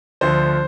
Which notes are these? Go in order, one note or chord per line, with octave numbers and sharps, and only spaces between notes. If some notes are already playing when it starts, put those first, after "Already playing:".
D2 D3 F3 C5